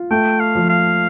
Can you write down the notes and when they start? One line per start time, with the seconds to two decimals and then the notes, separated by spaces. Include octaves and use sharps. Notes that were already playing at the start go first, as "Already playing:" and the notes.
Already playing: F4
0.11 A3 G5
0.40 F5
0.55 F3
0.69 F5